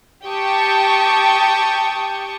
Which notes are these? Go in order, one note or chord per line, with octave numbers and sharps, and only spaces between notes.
G4 G5 A5 C#6 D#6